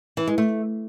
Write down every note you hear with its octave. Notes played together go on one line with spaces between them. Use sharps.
E3
G#3
A3